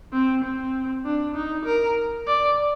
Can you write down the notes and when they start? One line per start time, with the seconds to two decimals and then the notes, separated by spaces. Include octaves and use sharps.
0.13 C4
0.44 C4
1.05 D4
1.35 D#4
1.66 A#4
2.27 D5